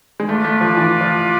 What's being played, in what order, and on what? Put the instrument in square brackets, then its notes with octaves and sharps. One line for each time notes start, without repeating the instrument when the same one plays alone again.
[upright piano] G#3
[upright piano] A3 [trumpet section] F4 B4 D5
[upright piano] A3
F3
E3
F3